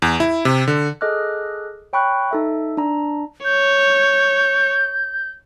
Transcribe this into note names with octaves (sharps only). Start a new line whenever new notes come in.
E2
E4
C3
D3
G#4 A4 D#5 D6 F6 F#6
C#5 G5 B5 C#6 F#6
D#4 A4 E5
D4 A#5
C#5 G6